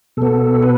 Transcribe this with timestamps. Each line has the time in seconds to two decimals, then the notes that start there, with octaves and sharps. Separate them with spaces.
0.17 B2 B3 A4
0.63 B4